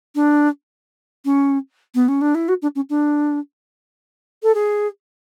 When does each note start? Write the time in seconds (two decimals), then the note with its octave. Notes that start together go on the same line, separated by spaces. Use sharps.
0.15 D4
1.25 C#4
1.95 B3
2.08 C#4
2.21 D4
2.35 E4
2.48 F#4
2.62 D4
2.76 C#4
2.90 D4
4.43 A4
4.55 G#4